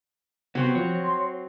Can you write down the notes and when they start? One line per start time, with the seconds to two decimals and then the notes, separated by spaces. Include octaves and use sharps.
0.55 C3 F#3 B3 C4 F#4
0.75 F3 C#5
1.03 C6